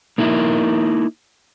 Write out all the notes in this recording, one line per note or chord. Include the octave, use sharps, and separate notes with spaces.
A#3 D#4 E4 A#4